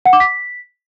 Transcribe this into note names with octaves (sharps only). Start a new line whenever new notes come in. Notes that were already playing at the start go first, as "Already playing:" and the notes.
F#5
D6
B6